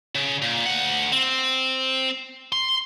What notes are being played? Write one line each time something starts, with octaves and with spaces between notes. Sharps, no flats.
C#3
A#2
D2 F#5
C4
C6